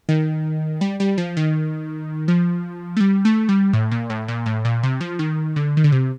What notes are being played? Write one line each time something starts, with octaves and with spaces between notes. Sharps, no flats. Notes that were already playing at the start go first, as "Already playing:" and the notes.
D#3
G3
G3
F3
D#3
F3
A3
G3
A3
G3
A2
A#2
A2
A#2
A2
A#2
C3
F3
D#3
D3
D#3
D3
C3